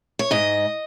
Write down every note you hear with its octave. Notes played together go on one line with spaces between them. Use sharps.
C#5
G#2 D#5